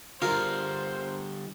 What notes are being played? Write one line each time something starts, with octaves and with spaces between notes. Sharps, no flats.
D3 G3 F4 G#4 A#4 C5